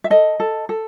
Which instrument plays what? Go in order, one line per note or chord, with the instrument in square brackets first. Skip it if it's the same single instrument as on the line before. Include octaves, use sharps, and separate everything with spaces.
[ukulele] E5
A4 D#5
A4
A4